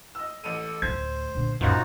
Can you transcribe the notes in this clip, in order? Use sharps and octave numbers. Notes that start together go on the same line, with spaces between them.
D#5 E6
A1 A4 D#7
D2 A2 C5 G#6
A#2 D3
C#2 F#2 A#2 D#4 F4 F#4 C5 F5